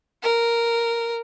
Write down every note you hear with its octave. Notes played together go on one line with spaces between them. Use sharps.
A#4